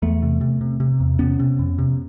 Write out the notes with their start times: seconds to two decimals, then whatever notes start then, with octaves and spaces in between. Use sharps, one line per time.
0.02 E2 A3 B3
0.22 C3
0.41 C3
0.61 C3
0.80 C3
1.00 E2
1.19 C3 B3 C#4
1.40 C3
1.59 F2
1.78 C3